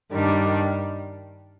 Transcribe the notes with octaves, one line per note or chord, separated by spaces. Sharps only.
G2 D#3 G3 D4